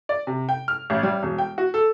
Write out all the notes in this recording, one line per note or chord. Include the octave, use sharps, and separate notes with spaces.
D5
C3
G5
F6
A1
G3
E1
G5
F#4
A4